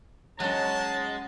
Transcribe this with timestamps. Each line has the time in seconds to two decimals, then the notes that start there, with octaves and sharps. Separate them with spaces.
0.40 F#3 G#3 C#4 C#5 A5